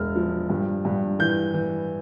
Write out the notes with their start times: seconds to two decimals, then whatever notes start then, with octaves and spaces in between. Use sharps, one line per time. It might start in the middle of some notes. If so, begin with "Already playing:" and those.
Already playing: E1 F6
0.16 F3
0.50 G2
0.85 G2
1.19 E3 G6
1.54 E3